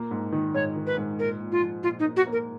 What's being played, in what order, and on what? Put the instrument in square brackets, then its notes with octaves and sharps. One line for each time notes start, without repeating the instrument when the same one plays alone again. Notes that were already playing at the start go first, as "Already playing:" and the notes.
Already playing: [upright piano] A#2 A#3
G#2
D#3
[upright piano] G#2 [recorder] C#5
[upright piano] D#3
[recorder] B4
[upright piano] G#2
[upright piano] A#2 [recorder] A#4
[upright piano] A#2
[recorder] F4
[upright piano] F3
[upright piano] A#2 [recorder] F4
[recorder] D#4
[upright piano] A#3
[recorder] F#4
[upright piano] A#3
[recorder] A#4